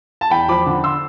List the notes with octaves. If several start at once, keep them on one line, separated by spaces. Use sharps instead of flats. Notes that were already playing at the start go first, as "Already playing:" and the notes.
A5
E2 G5 B5
F3 B5 D6
D3
C6 E6